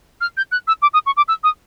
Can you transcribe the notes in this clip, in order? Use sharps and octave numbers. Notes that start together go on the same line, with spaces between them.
F6
G6
F#6
E6
D6
D#6
C#6
D6
E6
D#6